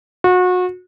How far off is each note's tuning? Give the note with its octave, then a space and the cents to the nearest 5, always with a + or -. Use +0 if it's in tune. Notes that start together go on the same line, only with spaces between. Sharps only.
F#4 -30